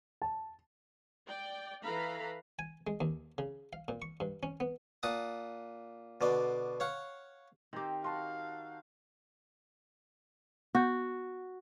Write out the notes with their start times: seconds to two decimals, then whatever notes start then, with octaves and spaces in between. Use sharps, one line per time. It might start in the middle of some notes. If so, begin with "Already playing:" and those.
0.22 A5
1.26 D5 G5
1.83 E3 A4 B4 F5 A#5 B5
2.59 G#5
2.87 G#3
3.01 D#2
3.38 C#3
3.73 F5
3.88 A#2
4.02 C#6
4.20 G2
4.43 C#4
4.60 B3
5.03 A#2 F#5 A5 D#6
6.21 B2 D3 D5
6.80 C#5 F5 F#5
7.73 D#3 C4 G4 A#4 C5
8.04 F#4 F5 A5 C6
10.75 B3 F#4 G6